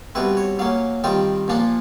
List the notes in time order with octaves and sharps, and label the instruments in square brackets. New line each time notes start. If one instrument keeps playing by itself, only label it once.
[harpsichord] B2 G3 C4 E4 B4
C#5
F#3 A#3 C#4 F5
D#3 G3 C4 F4 G5
A#2 F3 A#3 D4 F4